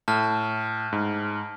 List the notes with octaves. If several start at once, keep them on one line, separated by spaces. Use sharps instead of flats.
A2 A5 F6
G#2